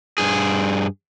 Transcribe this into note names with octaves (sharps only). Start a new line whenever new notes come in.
G2 G#4